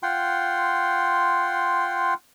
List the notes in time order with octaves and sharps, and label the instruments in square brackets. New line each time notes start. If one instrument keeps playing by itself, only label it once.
[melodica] F4 F#5 G5 C6